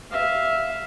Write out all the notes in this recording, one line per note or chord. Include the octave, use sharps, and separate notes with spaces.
E5 F5